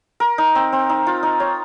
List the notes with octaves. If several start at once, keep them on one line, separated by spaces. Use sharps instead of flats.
A#4
D#4
C4
C4
D#4
F4
D#4
C#5